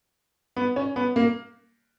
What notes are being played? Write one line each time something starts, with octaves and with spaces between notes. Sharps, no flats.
B3
C#4
B3
A#3